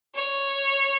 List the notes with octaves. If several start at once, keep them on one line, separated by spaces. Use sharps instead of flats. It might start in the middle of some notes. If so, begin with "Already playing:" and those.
C#5